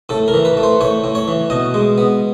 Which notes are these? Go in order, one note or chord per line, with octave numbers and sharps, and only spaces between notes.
A2 A4
A#4
E3
B4
A3
C5
A2 C#5
A2
C#5
E3
B2 D#5
G#3
B3